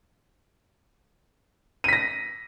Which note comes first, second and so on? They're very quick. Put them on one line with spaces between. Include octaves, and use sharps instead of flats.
D#7 B6 A#6